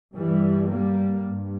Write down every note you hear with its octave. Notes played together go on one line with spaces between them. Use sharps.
G2 E3 G3
G3 A#3
G2